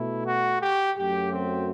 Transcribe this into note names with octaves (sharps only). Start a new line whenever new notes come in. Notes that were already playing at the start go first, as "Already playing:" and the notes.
Already playing: B2 A3 E4
F#4
G4
F#2 F#3 A3 G4
C4